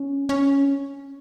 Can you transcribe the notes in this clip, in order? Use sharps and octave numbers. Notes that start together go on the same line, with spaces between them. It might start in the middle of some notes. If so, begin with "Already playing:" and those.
Already playing: C#4
C#4